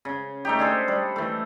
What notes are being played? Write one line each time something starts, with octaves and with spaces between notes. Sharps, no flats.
C#3
A3 D#4 G4
D4 G#4 A4 C5
G3
E3 A3